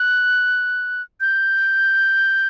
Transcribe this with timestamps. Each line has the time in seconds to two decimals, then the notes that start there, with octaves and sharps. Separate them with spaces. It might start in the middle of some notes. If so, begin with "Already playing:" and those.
Already playing: F#6
1.21 G6